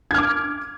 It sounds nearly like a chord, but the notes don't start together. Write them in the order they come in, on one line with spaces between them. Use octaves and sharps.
G#6 F6 D6